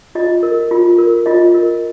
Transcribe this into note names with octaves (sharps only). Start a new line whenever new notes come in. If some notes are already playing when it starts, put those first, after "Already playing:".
F4 D#5
A#4
F4
A#4
F4 D#5
A#4